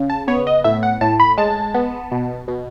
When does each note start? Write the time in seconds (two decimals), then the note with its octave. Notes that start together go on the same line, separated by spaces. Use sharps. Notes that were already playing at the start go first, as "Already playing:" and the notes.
Already playing: C#3
0.10 A5
0.28 B3 C#5
0.47 D#5
0.64 A2 E5
0.83 F#5
1.01 A2 A5
1.20 B5
1.38 G#3 A5
1.74 B3
2.12 B2
2.48 B2